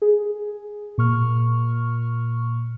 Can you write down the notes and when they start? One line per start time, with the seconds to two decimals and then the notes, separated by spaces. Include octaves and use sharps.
0.02 G#4
0.98 A#2 C#6 F6